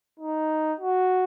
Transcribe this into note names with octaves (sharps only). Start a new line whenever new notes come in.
D#4
F#4